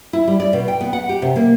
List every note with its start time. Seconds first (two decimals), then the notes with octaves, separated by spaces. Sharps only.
0.13 E4
0.28 G3
0.40 D5
0.53 B2
0.68 G5
0.81 B3
0.93 F#5
1.09 G4
1.22 C3
1.36 A#3